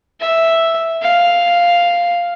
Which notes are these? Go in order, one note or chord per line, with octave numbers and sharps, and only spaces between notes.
E5
F5